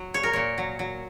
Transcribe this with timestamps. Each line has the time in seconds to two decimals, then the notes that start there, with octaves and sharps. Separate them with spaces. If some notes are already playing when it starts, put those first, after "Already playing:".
Already playing: F#3
0.14 A#2 C#5
0.23 A#4
0.33 A#2 C#5
0.58 F#3
0.79 F#3